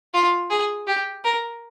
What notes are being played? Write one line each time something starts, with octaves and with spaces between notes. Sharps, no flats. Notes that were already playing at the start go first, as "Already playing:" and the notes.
F4
G#4
G4
A#4